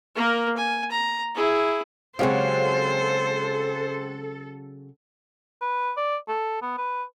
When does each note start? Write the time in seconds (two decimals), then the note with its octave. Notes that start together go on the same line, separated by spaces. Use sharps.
0.16 A#3 A#4
0.57 G#5
0.91 A#5
1.35 E4 G#4
2.19 C#3 F#3 G#3 C4 G4 A4 C5 F5
5.62 B4
5.97 D5
6.28 A4
6.62 B3
6.78 B4